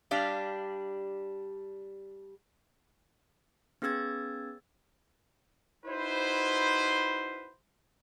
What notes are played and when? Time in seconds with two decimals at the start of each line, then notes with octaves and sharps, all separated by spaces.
0.11 G3 D4 G4 F5
3.82 B3 C#4 G#4 E6 G#6 A6
5.86 D#4 E4 F#4 B4 C5